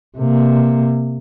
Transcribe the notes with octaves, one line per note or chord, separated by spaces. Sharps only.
C3 A#3